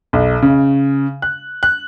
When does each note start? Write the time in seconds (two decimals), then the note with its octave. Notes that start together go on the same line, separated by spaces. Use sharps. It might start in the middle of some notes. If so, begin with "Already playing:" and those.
0.13 B1
0.42 C#3
1.22 F#6
1.63 F#6